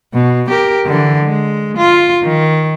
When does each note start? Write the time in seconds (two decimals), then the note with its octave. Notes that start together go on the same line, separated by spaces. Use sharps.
0.13 B2
0.49 G4 A#4
0.86 D3 E3
1.24 G#3
1.77 F4
2.23 D#3